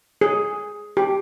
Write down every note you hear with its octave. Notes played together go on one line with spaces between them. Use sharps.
G#4
G4